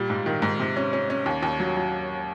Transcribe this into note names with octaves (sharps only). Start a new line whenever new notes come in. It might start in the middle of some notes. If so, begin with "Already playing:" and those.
Already playing: A#2 G3
G#2
D#3
G#2
C3
C#4
C#4
C#4
D#2
D#2
F#3
F#3